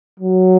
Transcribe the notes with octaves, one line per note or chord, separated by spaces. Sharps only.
F#3